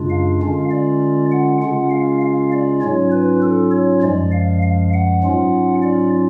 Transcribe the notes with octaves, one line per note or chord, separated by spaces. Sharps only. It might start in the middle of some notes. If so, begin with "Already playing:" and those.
Already playing: F#2 C#3 G#3 D4 F4
F5
D3 G#3 C#4 F4
D5
F#5
C#3 G#3 C#4 F4 F#5
F5
F5
D5
G#2 F#3 C#4 F4 C#5
B4
A4
C#5
F#2 F3 G#3 D5
F5
F5
F#5
G#2 F#3 C#4 F4
D5